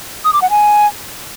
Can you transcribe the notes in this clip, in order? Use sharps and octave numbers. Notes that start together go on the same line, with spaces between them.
D#6
D6
F#5
G#5